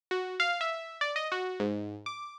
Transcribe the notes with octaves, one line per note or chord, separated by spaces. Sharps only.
F#4
F5
E5
D5
D#5
F#4
G#2
D6